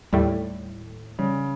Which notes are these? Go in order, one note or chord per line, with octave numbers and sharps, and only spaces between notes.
D#2 A2 G3
C#3 G3